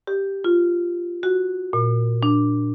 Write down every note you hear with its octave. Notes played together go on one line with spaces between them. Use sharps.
G4
F4
F#4
A#2
D4